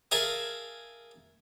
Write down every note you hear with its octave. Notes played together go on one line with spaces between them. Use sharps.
G#4 A#4 E5 F5 G#5 A5